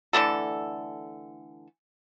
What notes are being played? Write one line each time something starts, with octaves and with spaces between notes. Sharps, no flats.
D3 E3 A3 A4